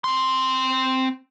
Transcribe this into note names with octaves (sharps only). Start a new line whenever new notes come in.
C4 C6